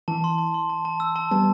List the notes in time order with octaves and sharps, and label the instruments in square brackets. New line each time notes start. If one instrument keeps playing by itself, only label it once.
[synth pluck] E3 [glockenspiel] A5
[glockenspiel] C6
A5
C6
A5
A5
E6
A5
[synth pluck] G3 B3 [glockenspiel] A5